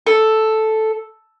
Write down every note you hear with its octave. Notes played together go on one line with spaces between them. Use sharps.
A4